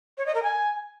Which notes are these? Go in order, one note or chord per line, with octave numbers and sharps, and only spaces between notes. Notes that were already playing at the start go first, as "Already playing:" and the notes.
C#5
D#5
A#4
G#5